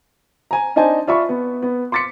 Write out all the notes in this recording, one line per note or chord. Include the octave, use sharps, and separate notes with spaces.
G#5 A#5
D4 D#4 C5 D#5 G#5 A5
F4 D5 E5 B5 C#6
B3
B3
C6 D6 A6 B6 C#7